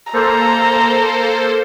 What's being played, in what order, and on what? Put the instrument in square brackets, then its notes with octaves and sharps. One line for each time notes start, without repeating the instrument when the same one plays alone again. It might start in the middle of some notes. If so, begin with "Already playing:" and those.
[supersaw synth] A#3 A4 C5 [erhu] A#5